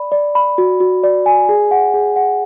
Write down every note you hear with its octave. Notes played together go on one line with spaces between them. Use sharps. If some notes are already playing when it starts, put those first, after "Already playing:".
Already playing: D5 B5
D5
B5
F#4
F#4
D5
G#5
G#4
F#5
G#4
F#5